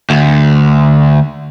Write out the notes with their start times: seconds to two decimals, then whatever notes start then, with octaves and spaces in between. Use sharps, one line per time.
0.10 D2